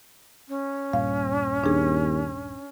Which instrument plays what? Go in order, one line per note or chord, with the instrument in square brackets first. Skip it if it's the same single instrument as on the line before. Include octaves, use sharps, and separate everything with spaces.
[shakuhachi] C#4
[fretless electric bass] D#1 G2 A#2 [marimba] F5
[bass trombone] D#2 [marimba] D4 G#4